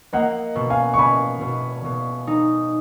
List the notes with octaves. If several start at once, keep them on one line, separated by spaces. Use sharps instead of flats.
A#3 D#5 F#5
B2
F5 G#5
C#6
B2 G#5 B5
B2
B2
D#4